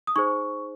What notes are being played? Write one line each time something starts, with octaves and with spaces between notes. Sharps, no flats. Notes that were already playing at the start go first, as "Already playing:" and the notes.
D#6
D#4 G#4 C5 C#6